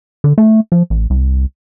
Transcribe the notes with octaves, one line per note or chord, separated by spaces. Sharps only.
D3
A3
F3
A1
C2